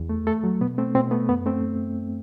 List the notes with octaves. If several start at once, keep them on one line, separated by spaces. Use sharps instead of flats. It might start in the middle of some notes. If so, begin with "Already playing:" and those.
Already playing: E2
A3
A3 A4
F#3
B2 B3
A3 C4
B2 C4
A3 B3
F#2 B3
A3 C4